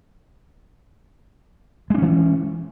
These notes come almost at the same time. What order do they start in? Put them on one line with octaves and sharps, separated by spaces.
G#3 D4 C#4 E3